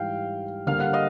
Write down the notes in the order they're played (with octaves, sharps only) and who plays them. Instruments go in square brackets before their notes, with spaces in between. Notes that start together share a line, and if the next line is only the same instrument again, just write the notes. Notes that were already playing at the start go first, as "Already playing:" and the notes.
Already playing: [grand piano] G#2 E3 G3 [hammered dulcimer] F5 G5
[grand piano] D3 G3 A#3 [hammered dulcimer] F5
[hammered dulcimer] F#5
D#5 F5